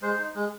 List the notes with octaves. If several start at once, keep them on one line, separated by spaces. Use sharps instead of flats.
G#3 C5
D#4
G#3